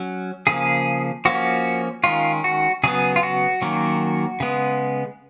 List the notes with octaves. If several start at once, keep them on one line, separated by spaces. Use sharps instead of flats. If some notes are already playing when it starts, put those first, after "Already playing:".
Already playing: F#3 C#4
C#3 F3 A#3 G#4
F3 A#3 C#4 F#4
D#3 G#3 C#4 F4
F#4
C#3 F#3 B3 G#4
F4
F#4
D#3 F#3 A#3 C#4
C#3 G#3 B3